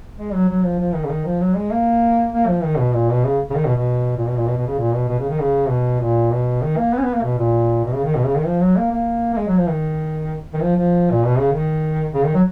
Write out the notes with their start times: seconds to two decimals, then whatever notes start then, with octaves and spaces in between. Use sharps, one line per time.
0.18 G#3
0.34 F#3
0.49 F#3
0.64 F3
0.79 F3
0.94 D#3
1.04 C#3
1.09 D#3
1.26 F3
1.41 F#3
1.56 G#3
1.72 A#3
2.33 A#3
2.48 F3
2.63 D#3
2.78 B2
2.93 A#2
3.10 B2
3.25 C#3
3.50 C#3
3.55 D#3
3.66 B2
3.76 B2
4.17 A#2
4.27 B2
4.37 A#2
4.47 B2
4.58 B2
4.67 C#3
4.79 A#2
4.94 B2
5.09 B2
5.19 C#3
5.29 D#3
5.40 C#3
5.69 B2
6.01 A#2
6.32 B2
6.62 D#3
6.77 A#3
6.93 B3
6.98 C#4
7.03 B3
7.14 A#3
7.23 B2
7.39 A#2
7.85 B2
7.95 C#3
8.05 D#3
8.16 B2
8.26 C#3
8.36 D#3
8.46 F3
8.62 F#3
8.77 A#3
8.92 A#3
9.33 A#3
9.38 G#3
9.48 F#3
9.58 F3
9.69 D#3
10.54 D#3
10.61 F3
10.76 F3
11.11 A#2
11.25 B2
11.39 C#3
11.52 D#3
12.14 C#3
12.25 D#3
12.35 F#3